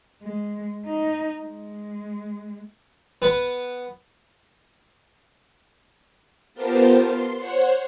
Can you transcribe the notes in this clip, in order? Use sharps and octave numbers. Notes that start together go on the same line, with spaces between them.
G#3
D#4
G#3
B3 B4
B3 F4 G4 A#4 C5 A5
C6
C5 C#5 F#5